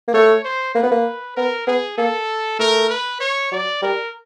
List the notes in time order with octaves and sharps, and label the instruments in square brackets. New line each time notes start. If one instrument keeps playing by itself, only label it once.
[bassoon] A#3
[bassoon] A3 [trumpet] C#5
[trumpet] C5
[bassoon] A#3 [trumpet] B4
[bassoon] B3
A#3
[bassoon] B3 [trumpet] A#4
[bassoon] B3 [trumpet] G#4
[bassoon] A#3 [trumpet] A4
[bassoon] A3 [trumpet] A#4
[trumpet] B4
C#5
[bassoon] F#3 [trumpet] D5
[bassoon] G3 [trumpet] A#4